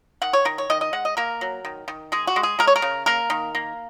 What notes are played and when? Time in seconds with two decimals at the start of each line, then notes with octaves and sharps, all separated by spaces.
0.22 D#3 F#5
0.33 C#5
0.45 D#3 A#4
0.58 C#5
0.70 D#3 D#5
0.81 D#5
0.93 G#3 F#5
1.05 D#5
1.17 A#3 A#4
1.41 F#3
1.65 D#3
1.88 D#3
2.12 G#3 G#4
2.27 F#4
2.36 G#3
2.43 G#4
2.59 G#3 A#4
2.67 C#5
2.76 A#4
2.82 C#3
3.06 A#3 A#4
3.30 D#3
3.55 A#3